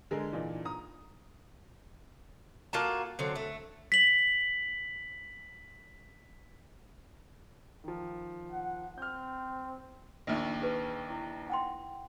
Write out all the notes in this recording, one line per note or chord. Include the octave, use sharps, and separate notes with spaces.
D3 G#3 G#4 A#4
A#2 E3 D4 D#4
A#5 D#6
A#3 F4 F#4 A5
D3 F#3 C4
A3
B6 F#7
D#3 F3
F#5
C4 F6 G6
A#1 D#2
G#4 B4
E4
F#5 G5 C6